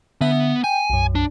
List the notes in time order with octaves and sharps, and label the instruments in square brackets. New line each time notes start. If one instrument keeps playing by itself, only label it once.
[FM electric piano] D3 E5 [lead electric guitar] B3
[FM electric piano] G5 [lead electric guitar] G#5
[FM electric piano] B1 F#2
[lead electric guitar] D4